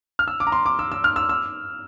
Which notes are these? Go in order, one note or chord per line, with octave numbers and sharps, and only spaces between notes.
F6
E6
D6
A#5
C6
D6
E6
E6
F6
E6
E6